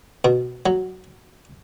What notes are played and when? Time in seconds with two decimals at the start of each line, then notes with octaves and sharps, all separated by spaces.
0.25 B2
0.66 F#3